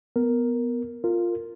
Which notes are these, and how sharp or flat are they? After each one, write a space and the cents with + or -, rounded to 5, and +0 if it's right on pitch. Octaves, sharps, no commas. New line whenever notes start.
B3 +0 A#4 +0
F4 +0 A#4 -20